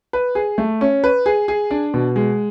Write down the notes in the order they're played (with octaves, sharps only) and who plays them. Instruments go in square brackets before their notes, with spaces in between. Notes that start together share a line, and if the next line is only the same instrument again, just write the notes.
[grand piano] B4
G#4
A3
C#4
B4
G#4
G#4
D4
B2
G#3